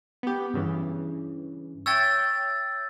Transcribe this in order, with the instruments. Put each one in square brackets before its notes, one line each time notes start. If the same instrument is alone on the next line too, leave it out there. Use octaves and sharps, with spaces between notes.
[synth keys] B3 G4
G2 C#3 E3
[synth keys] C#5 E5 G5 [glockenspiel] E6 G#6 A6